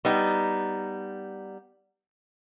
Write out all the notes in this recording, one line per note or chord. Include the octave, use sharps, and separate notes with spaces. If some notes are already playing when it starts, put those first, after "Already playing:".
G3 B3 D#4